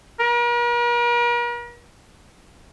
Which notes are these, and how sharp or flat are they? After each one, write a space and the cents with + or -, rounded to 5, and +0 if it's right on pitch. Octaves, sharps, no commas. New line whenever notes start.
A#4 +45